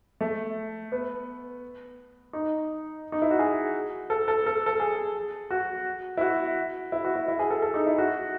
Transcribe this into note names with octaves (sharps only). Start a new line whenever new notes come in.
A3
B3
D#4
D#4
E4
F#4
G#4
A4
A4
A4
A4
G#4
F#4
E4
F#4
E4
F#4
E4
E4
G#4
A4
A4
D#4
E4
F#4